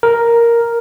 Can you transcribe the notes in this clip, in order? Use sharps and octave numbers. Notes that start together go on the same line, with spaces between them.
A#4